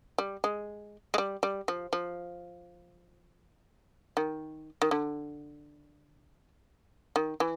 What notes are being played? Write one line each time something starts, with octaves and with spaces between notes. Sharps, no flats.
G3
G#3
G#3
G3
G3
F3
F3
D#3
D#3
D3
D#3
E3